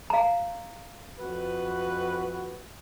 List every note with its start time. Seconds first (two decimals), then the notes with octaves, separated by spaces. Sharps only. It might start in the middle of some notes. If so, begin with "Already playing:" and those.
0.10 F5 A#5
1.20 F2 F#4 B4